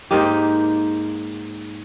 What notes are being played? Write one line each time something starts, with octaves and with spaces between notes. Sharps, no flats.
G#2 A#3 D#4 G4